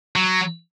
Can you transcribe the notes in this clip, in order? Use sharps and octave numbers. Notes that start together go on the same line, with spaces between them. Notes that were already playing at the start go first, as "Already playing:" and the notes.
F#3